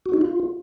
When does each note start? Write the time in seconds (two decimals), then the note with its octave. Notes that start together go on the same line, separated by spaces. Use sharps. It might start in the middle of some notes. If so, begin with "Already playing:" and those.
0.06 F#4
0.13 D#4
0.21 F4